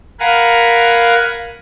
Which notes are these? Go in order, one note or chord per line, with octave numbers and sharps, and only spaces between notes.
A#4 F5 F#5 G#5 B5